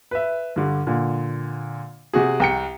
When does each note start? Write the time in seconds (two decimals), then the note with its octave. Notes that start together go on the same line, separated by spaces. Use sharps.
0.11 B4 E5
0.56 G2 D3
0.87 A#2 D3
2.14 C3 F#4 G#4
2.40 C2 G5 C#7